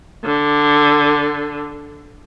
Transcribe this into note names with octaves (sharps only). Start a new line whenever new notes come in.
D3